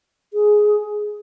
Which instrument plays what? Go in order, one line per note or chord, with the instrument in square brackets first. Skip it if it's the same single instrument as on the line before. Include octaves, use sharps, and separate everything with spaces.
[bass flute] G#4